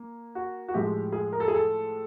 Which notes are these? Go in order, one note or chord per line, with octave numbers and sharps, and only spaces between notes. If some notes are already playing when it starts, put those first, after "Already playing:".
Already playing: A#3
F#4
F#4
A2 F3 G#3 G4
G#4
A#4
A4
G#4
A4